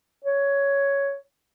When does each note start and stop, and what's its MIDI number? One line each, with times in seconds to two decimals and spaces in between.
0.25 1.18 73